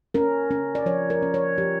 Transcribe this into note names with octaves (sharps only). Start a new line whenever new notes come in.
C#4 A#4
C#4
D5
F3 C#5
A#4
C#4
C#5
F3 G4